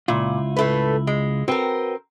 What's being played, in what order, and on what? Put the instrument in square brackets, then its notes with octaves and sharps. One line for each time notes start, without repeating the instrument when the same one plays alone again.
[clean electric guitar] C#2 E4 F4 [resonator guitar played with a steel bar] A#2
[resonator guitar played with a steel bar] A2 A3 B4
G#3
[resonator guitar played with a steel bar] C4 A#4 [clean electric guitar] F#4 B4 G5